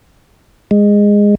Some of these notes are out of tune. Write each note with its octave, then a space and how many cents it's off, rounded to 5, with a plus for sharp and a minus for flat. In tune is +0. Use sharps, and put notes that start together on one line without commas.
G#3 -15